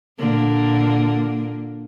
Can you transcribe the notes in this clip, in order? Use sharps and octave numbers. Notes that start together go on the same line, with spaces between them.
A#2 D3 A#3